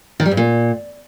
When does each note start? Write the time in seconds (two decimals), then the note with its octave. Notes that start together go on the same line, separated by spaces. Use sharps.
0.20 D#3
0.26 G3
0.31 G2
0.37 A#2